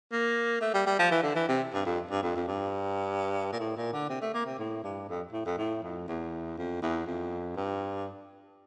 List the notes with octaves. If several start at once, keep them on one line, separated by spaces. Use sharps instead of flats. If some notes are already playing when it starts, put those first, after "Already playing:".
A#3
A3
G3
G3
F3
E3
D3
E3
C3
G2
F2
G2
F2
F2
G2
A#2
A2
A#2
D3
C3
A3
A#3
C3
A2
G2
F2
A2
F2
A2
F2
E2
F2
E2
F2
G2